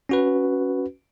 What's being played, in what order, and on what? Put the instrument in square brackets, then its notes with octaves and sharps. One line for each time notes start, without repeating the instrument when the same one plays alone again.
[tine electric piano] C#4 F#4 B4